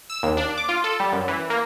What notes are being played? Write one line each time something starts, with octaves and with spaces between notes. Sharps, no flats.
E6
D#2
D4
D6
F4
A4
G3
F#2
E3
A#3